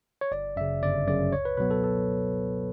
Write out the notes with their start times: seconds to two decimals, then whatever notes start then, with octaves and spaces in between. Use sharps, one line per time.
0.21 C#5
0.32 G1 D5
0.56 F#2 C#3 E5
0.82 G1 D5
1.07 F#2 C#3 D5
1.32 C#2 C#5
1.45 B4
1.57 B2 F#3 B3 B4
1.71 A4
1.84 A4